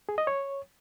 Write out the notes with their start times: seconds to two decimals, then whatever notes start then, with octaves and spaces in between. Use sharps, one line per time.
0.09 G#4
0.18 D#5
0.27 C#5